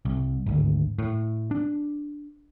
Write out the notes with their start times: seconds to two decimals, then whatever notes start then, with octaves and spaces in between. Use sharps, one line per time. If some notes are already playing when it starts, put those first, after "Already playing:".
0.05 C2
0.46 G#1 D2
0.99 A2
1.51 D4